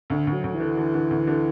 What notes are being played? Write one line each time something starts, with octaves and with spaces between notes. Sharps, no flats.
D2 D3
D2
F#3
D2
E3
D3
D3
D3
D2
D3